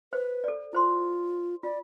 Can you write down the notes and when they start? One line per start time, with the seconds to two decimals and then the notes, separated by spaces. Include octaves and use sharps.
0.13 B4 C5
0.44 A4 D5
0.73 E4 F4 C5 C6
1.63 F4 D5